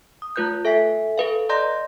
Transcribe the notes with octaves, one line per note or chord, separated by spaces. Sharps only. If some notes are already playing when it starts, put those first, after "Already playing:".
D#6
A3 F4 B4 F#6 G6
A4 E5 G#5 B6
A4 B4 F5
D5 D#5 A#5 C6 G6 A#6